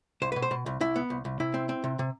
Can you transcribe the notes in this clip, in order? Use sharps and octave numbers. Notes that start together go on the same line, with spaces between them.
C2 C5
B2 B4
C5
B2
C2
C2 E4
B3
C2
C2
C3 E4
C4
C4
C3
C3